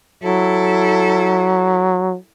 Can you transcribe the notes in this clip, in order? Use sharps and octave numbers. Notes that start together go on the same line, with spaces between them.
F#3 E4 A4